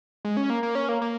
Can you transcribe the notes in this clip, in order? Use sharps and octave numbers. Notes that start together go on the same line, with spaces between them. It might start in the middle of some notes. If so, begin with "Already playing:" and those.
G#3
C#4
A#3
A#3
C#4
A#3
A#3